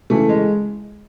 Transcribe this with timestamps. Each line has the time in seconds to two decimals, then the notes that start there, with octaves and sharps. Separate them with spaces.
0.10 C#3 E3 A3
0.29 G#3